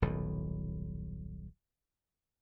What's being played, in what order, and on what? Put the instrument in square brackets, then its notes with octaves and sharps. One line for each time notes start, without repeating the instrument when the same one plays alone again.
[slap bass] D#1 B1 A2 D#3